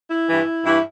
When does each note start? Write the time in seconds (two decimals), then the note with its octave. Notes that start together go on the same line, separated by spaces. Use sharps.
0.10 E4
0.28 G2 E3
0.65 G2 E3 E4